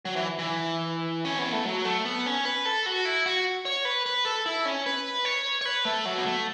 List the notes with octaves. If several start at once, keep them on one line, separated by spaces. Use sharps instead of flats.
F#3
E3
E3
C#4
B3
A3
F#3
A3
B3
C#4
B4
A4
F#4
E4
F#4
C#5
B4
B4
A4
E4
C#4
B4
C#5
C#5
B4
A3
F#3
B3
A3